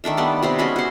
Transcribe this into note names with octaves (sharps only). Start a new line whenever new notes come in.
D#3 A3 D4 E5
G3 B3 A5
C3 B3 C4
G#3 C#4 F#4 E5
F#4 C5